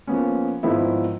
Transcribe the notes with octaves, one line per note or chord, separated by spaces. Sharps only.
F3 A#3 B3 C#4
G#1 D#3 F3 B3 E4 E5